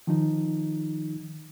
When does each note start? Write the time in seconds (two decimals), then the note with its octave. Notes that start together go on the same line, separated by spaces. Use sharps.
0.07 D#3 F3 D#4